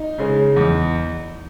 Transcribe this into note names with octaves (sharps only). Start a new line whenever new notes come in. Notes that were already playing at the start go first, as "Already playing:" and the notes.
Already playing: D#4
C#3 G#3
E2